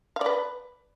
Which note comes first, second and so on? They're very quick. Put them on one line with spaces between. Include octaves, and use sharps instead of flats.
F5 D5 B4